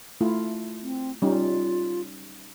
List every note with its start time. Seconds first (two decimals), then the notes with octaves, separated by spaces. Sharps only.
0.21 A3 E4 F4
0.82 C4
1.22 G3 C#4 D#4 F4